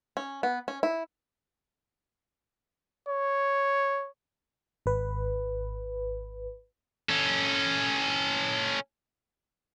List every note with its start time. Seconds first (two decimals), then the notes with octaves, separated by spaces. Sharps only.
0.17 C#4
0.43 B3
0.68 C#4
0.83 E4
3.08 C#5
4.86 G#1 B4
7.09 C#4 A4